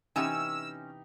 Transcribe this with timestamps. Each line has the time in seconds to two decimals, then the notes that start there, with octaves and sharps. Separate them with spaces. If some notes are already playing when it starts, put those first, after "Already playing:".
0.16 C3 E3 B3 C#4 D#4 G4 G#5 E6